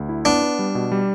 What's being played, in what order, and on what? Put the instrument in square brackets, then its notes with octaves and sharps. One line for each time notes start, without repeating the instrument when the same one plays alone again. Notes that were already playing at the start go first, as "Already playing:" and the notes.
Already playing: [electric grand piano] D2
E4
[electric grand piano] B3 [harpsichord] D4
[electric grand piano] B3
G3
B2
G3